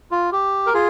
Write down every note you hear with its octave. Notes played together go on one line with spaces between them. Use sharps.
F4
G4
A#4
F4 G#4